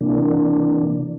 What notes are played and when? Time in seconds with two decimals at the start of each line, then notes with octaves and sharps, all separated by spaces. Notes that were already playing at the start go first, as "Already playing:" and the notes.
0.01 C3 E3 A#3 D4